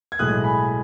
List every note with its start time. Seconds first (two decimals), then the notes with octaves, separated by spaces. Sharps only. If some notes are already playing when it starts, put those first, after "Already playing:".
0.12 G#6
0.19 B1 A2 G#3 D#6 F#6
0.44 G#5 B5